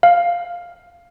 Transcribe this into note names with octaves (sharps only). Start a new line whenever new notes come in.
F5